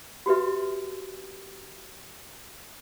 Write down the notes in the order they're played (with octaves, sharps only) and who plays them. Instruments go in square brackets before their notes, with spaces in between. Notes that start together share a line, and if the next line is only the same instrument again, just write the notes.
[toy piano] F#4 G4 B4 E5